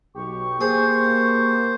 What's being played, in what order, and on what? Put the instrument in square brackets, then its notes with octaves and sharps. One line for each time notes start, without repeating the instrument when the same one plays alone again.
[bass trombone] B1 [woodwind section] G4 C#6
[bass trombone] A#3 [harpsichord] G#4 [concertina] C5